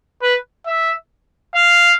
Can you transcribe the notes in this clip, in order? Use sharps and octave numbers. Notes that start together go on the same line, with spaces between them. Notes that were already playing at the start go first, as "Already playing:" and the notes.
B4
E5
F5